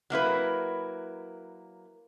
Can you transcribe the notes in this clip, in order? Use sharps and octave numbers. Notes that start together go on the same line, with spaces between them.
F#3 A#3 E4 B4